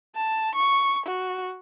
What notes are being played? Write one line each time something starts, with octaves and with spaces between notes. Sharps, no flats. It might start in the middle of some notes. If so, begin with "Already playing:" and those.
A5
C#6
F#4